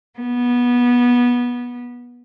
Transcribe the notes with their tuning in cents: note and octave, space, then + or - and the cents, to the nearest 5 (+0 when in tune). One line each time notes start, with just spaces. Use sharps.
B3 -20